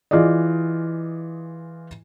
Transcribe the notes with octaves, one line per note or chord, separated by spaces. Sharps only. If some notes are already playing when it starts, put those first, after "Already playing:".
E3 F4 G#4 D5 D#5